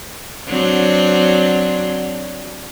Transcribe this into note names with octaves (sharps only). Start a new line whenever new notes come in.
F#3 C4 D4